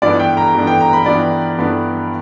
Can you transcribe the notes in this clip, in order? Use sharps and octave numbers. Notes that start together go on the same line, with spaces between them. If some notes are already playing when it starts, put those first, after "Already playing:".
G2 E3 B3 D4 D5
G5
A#5
G2 E3 B3 D4
G5
A#5
B5
G2 E3 B3 D4 D5
G2 E3 B3 D4